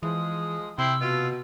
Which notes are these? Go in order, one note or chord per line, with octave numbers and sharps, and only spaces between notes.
E3 F3 G#3 D#6
C3 E4 G5 C6 E6
B2 F4